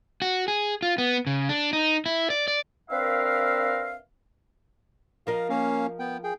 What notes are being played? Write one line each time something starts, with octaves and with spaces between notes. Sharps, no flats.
F#4
G#4
F4
B3
C#3
D4
D#4
E4
D5
D5
C4 D4 A#4 B4 E5 F5
F3 A#4 D#5 F5
A#3 C#4 F5
B3 G5
G#4 G5